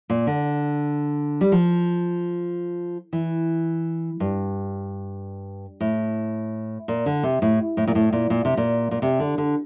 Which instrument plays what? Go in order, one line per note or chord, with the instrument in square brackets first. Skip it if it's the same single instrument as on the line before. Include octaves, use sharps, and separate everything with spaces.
[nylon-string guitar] A#2
D3
G3
F3
E3
G2
A2
A#2
D3
C3
A2
A2
A#2
A2
A#2
A#2
C3
A#2
A#2
C3
D3
D3